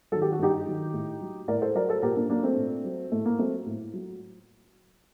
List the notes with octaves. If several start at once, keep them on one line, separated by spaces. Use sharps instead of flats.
D#3 F#3 A4
G4
F#4
G2 D#4 G4
D#3 F#3
A2
F#3
A2 A#4 D5
A4 C5
F#3 A#4 D5
A4 C5
A#2 G4 A#4
A#3 D4
F#3 A#3 D4
A3 C4
A#2
F#3
A2 A3
A#3
F#3 A3 C4
A2
F#3